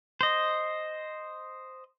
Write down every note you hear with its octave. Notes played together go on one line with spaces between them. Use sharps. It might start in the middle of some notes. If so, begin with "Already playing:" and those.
C5 D#5